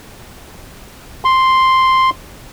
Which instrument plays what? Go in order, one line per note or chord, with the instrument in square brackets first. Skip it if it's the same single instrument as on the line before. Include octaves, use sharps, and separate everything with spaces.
[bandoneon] C6